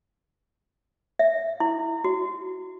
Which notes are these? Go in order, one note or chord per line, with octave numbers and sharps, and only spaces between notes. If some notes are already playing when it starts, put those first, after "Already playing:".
E5
E4
F#4